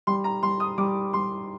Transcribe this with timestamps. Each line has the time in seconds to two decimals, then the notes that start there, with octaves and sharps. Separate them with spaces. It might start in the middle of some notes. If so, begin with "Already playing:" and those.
0.07 G3 C6
0.24 A#5
0.43 G3 C6
0.60 D#6
0.78 G3 D6
1.13 G3 C6